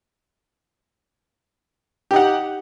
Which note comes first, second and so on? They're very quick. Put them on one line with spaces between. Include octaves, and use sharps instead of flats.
G4 D#4 F#5